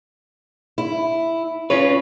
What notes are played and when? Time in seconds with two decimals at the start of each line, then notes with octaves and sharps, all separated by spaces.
0.78 E4
1.70 C#4 F4 B4 C#5